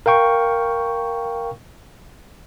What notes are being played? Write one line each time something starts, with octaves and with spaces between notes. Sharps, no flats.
A#4 F5 G5 C#6